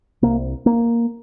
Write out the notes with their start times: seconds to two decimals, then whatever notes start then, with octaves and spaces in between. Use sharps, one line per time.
0.22 C2 C3 A#3
0.66 A#3